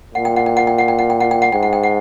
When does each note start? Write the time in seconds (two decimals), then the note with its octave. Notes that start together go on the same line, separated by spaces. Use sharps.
0.14 A#2 F#5
0.25 G5
0.36 F#5
0.46 G5
0.57 F#5
0.67 G5
0.78 F#5
0.88 G5
0.99 F#5
1.10 G5
1.21 F#5
1.31 G5
1.42 F#5
1.52 G#2 G5
1.63 F#5
1.73 G5
1.83 F#5